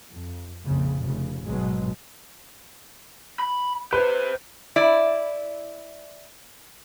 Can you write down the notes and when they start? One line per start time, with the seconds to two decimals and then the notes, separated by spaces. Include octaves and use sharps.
0.12 F2
0.65 A#1 F2 C#3
1.03 F1 C#3
1.45 G#1 B2 F#3 G#3
3.39 B5
3.93 G4 B4 C5
4.76 E4 D5